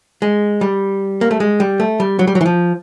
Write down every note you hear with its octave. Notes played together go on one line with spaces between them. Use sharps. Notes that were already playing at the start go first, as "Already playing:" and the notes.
G#3
G3
A#3
A3
G#3
G3
A3
G3
F#3
G3
F#3
E3
F3